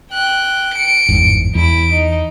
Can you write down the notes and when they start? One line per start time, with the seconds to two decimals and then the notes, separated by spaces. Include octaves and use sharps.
0.12 G5 F#6
0.75 C#7 D7
1.09 G1 E2 G#2
1.55 E2 E4 D7
1.93 D#4